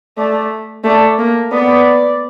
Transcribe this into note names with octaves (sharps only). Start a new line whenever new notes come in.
A3 D5
A3 D5
A#3
B3 D5